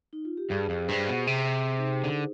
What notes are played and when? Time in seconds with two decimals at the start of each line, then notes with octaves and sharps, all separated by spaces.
0.13 D#4
0.25 F4
0.37 G4
0.50 G2 G#4
0.69 F2
0.88 G2 C5
1.08 B2
1.27 C3 C5
1.78 D#4
2.04 D3